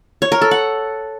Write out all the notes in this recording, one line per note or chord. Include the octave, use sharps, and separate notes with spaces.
C#5
A#4
A4
F#5